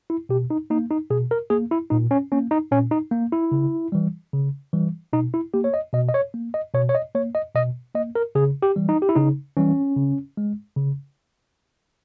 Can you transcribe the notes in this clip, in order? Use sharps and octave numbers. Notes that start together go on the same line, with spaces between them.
E4
B2 G4
D#4
A#3 D#4
D#4
B2 G#4
A#4
A#3 G#4
E4
A#2 D#4
C#4
A#3 C#4
D#4
A#2 C#4
D#4
A#3
E4
C#3
E3 G3
C#3
E3 G3
B2 D#4
E4
A#3 G4
C#5
D#5
B2 D#5
D#5
C#5
A#3
D#5
B2 C#5
C#5
D#5
A#3 C#5
D#5
B2 D#5
A#3 D#5
A#4
C#3 G#4
G4
E3 G3
D#4
G4
E4
C#3 D#4
E3 G3 C#4
C#3
G#3
C#3